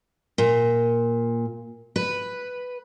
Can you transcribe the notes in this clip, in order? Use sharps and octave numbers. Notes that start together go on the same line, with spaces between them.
A#2
B4